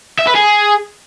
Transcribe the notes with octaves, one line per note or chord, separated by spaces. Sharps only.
E5
B4
G#4